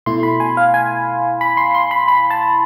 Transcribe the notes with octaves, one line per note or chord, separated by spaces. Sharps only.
B2 A3 E4 C6
B5
G#5
F5
G#5
B5
C6
C6
B5
B5
A5